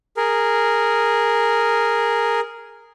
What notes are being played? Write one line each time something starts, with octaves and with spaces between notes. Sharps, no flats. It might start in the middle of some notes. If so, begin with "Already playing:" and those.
G#4 A#4